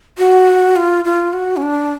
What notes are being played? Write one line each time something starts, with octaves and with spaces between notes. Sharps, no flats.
F#4
F4
F4
F#4
C#4
D4